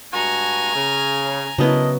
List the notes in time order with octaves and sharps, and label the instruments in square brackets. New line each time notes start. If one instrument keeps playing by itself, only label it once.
[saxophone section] G2 G#3 F#4 [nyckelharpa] G#5 A#5
[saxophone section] C#3
[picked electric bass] C#3 [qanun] F#3 B3 E4 [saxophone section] D4 A#4 D#5